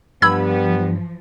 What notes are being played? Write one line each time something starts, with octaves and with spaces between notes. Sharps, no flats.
G2 F3 G3 B3 B5 E6 G#6